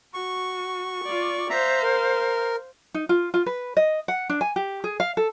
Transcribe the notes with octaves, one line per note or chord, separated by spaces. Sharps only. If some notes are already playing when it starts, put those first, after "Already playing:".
F#4 C#6
F4 D5
C5 E5 F5 A#5
A#4
D#4
F4
F4
B4
D#5
F#5
D4
G#5
G4
G#4
F5
A4